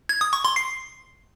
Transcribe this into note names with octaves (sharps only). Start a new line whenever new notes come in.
G#6
D#6
C#6
C6
C7